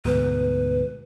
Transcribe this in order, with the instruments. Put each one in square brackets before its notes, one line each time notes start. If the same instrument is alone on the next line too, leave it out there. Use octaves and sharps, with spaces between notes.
[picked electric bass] D2 G#2 B2 [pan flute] B4